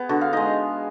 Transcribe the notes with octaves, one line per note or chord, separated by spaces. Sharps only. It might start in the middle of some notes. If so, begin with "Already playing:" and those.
Already playing: B3 G#4
D3 F#4
F5
G#3 D#4 D#5